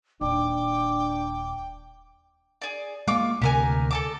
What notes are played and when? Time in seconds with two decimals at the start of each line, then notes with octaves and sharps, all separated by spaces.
0.21 D#1 D4 G5 D6
2.62 G#4 D5
3.08 G#3 A#3 F4 C#6 D6
3.42 D2 C3 G4 A#4 G#5
3.91 A4 A5 D6